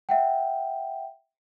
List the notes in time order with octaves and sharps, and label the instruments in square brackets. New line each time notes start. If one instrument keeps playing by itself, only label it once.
[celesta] E5 F#5 G5